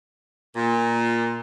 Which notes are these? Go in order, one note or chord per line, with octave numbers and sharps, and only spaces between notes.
A#2